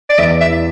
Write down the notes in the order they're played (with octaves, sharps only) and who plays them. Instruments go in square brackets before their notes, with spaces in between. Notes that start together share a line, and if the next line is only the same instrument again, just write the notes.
[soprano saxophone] D5
[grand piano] E2 [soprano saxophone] E5
[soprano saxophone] E5
[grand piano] E4